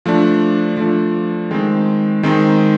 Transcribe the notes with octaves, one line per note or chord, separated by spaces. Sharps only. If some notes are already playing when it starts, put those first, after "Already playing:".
F3 A3 D4
F3 A3 D4
D#3 G#3 C4 D#4
D#3 G#3 C4 D#4